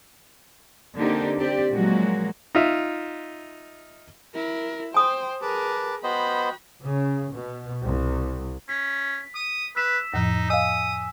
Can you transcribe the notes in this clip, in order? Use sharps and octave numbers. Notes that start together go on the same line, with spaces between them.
D3 A#3 C4 D4 D#4 G4
C4 G4 D5
A#2 F3 F#3 G#3 A#3 F#4
D#4 F4 E5
E4 A#4
C5 G5 G#5 D#6
G#4 A#4 B4 A5 D6
B3 F#4 C5 D#5 G5 B5
C#3
B2
C2
C#4 B6
D#6
B4 E6 B6 E7
F2 A2 F3 D#4
D#5 F5 G#5 D#6 E6